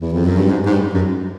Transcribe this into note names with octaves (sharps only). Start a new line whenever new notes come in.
E2
F2
F#2
G2
G#2
G#2
G2
F#2